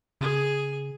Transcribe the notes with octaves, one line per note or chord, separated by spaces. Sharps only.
C#3 G#4